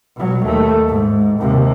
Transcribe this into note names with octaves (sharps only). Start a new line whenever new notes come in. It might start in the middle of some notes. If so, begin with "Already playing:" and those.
B2 F#3
D#2 A3
G#2
D#2 C3